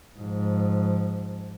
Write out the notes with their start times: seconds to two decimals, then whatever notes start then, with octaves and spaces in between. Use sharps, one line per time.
0.17 G#2 F3